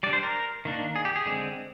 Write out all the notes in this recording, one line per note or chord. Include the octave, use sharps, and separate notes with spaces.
G3 D4 D5
C5
A#4
D#3 A#3 D4
G#4
G4
G#4
D3 G#3 C4